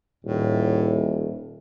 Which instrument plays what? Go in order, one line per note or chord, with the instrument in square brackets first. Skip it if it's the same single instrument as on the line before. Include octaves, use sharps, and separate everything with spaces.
[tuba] D#1 [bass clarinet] A2